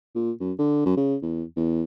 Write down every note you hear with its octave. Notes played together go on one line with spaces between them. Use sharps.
A#2
F#2
D3
F#2
C#3
E2
E2